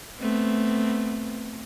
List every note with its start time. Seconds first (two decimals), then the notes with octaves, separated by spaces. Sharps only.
0.19 A3 B3 C4